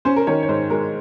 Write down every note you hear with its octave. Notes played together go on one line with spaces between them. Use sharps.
C#4 C5
A#4
D#3 A#4 C#5
C#5
G#2 C5
G#3 A#4